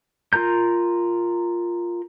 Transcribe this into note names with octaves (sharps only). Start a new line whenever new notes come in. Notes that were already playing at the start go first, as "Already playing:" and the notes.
F4 A#4 A#5 G6